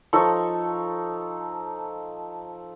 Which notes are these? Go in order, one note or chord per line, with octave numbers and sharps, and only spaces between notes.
F3 D#4 A4 C#6